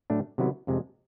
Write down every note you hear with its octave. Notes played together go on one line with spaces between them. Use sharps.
A2 F#3 A3 D4
C3 D#3 F#3 B3 E4
F2 C3 D#3 G#3